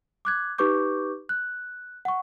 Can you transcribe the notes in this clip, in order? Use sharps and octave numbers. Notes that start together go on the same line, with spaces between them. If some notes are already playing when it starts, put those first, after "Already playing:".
D6 F#6 G#6
D#4 G4 B4 C#6 D6 G6
F#6
F#5 C#6